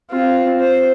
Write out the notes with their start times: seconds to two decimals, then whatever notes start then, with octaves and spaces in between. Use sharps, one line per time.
0.11 C4 F4
0.60 C5